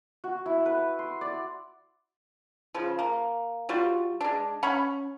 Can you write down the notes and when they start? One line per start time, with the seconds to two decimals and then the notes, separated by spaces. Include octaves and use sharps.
0.24 F#4
0.46 E4
0.66 B4
0.99 C6
1.21 D5
2.75 C#3 F3
2.99 A#3
3.69 G3 F4 F#4
4.21 G#3 D4
4.63 C#4 F#5 B5 C#6